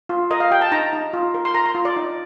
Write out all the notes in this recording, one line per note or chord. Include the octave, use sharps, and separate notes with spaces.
F4
A#4 D#5
F5
G4 G5
A5
D#4 A#5
D#4
F4
A#4
C6
A#4 A#5
C6
F4
D5
D#4